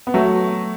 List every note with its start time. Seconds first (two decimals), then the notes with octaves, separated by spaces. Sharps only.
0.07 B3
0.14 F#3 A3